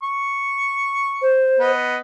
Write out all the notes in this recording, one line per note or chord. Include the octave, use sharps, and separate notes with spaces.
C#6
C5
B3 D#5